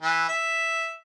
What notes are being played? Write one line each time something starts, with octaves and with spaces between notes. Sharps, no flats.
E3
E5